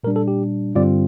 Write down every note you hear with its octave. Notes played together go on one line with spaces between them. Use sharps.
A#2 G3 D4 A#4
A4
G4
G2 D3 G3 C4 F4 D5